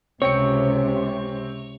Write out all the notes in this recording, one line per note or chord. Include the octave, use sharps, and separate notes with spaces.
C#2 C3 C4 C#5 G5 C#7